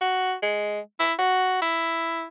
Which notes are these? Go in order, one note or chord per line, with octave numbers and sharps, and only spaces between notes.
F#4
G#3
E4
F#4
E4